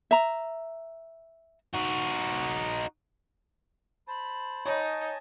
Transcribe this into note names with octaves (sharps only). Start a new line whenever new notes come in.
E5 A#5
D#4 F#4
C5 A5 B5
D#4 C#5 D#5 G#5 A5